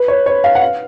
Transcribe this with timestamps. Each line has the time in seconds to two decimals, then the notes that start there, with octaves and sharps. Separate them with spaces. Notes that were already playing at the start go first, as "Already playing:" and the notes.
Already playing: B4
0.08 C#5
0.26 C#5
0.44 F5
0.55 F#5
0.61 F5